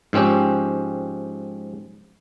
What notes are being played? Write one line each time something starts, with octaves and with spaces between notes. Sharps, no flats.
G#2 F3 C4 C#4 G4